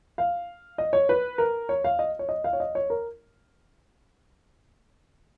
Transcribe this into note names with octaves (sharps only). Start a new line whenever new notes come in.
F5
D#5
C#5
B4
A#4
C#5
F5
D#5
C#5
D#5
F5
C#5
D#5
C#5
A#4